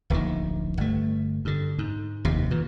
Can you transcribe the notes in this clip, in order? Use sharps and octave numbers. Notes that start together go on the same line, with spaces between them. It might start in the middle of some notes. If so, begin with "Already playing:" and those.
D1 A#1 B2 D#3
G1 A3
G2 D3
G#2
F1 D#2 C3
A#2 E3